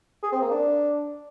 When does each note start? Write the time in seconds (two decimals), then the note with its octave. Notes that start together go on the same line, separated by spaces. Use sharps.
0.23 G#4
0.32 C4
0.42 A#3
0.51 D4